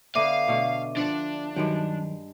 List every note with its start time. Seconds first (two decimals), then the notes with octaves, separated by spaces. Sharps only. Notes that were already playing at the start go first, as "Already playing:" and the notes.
0.15 D3 B3 D4 E5 F5 D6 D#7
0.48 B2 D3 A3
0.97 F3 D4 F#5
1.56 G2 D#3 F#3 G#3 G5